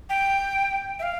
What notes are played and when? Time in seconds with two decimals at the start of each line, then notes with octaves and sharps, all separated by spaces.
0.09 G5
0.99 E5
1.03 F5